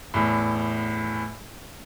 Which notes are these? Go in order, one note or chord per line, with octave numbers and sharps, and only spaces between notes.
E2 A2